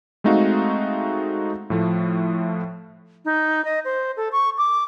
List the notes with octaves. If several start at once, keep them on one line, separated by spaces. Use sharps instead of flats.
G#3 A3 C4 D#4 F#4 F5
A2 F3 A3
D#4
D#5
C5
A4
C#6
D6